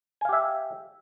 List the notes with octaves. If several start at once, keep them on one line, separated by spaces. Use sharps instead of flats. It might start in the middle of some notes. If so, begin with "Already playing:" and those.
G4 E5 F5 G#5